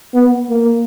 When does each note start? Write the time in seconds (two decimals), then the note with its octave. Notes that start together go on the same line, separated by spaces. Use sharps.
0.14 B3
0.49 A#3